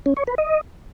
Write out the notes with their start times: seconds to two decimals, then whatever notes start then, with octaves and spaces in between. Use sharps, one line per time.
0.06 C#4
0.17 C#5
0.27 B4
0.38 D#5